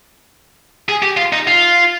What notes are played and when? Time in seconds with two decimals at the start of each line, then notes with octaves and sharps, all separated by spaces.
0.89 G#4
1.02 G4
1.17 F4
1.33 D#4
1.47 F4